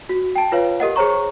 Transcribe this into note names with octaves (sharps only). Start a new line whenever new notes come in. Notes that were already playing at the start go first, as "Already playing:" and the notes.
F#4
G5 A5
F4 B4 C#5 F5
G4 A#4 D#5 F#5
G#4 C5 C#5 A#5 C#6